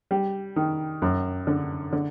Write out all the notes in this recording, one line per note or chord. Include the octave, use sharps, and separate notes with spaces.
G3
D#3
F#2
D3
D3